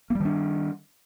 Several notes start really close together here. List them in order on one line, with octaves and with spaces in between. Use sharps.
A#3 G3 D#3 D4